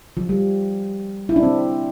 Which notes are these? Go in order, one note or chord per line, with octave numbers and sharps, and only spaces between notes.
F3
G3
E4
D4
C4